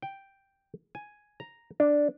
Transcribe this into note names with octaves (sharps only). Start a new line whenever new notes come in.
G5
G#5
A#5
D4